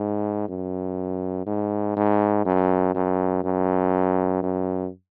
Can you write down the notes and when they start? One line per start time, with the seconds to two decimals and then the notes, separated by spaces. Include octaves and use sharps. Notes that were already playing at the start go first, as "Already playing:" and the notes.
Already playing: G#2
0.48 F#2
1.47 G#2
1.97 G#2
2.45 F#2
2.95 F#2
3.44 F#2
4.43 F#2